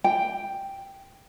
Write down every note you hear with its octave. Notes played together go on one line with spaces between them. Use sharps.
G5